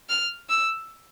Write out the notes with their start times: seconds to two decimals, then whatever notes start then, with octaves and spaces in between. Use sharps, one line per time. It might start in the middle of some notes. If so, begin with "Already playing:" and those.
0.09 F6
0.49 E6